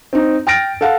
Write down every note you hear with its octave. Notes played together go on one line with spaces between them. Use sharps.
C4 D#4
G5 F6 A6 A#6 D7
A4 F5 F#5